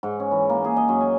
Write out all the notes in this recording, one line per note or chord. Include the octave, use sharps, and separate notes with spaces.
G#2
C#4
E3
A#3
G#4
D#5
F#2
G#5